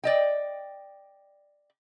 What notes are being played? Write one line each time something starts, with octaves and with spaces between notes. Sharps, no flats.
D5 D#5 G5